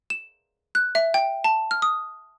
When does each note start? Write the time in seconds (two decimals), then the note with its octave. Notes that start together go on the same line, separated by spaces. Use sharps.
0.10 E7
0.75 F#6
0.95 E5
1.14 G5
1.44 A5
1.71 F6
1.82 D#6